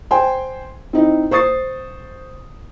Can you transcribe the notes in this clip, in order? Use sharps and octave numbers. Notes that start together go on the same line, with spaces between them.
C5 G5 G#5 C6
C4 D#4 E4 D#5
C5 C#6 D#6 A6 C7